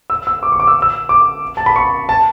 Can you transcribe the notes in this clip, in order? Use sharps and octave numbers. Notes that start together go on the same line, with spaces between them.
E6
E6
D6
C#6
D6
E6
E6
D6
A5
B5
C#6
A5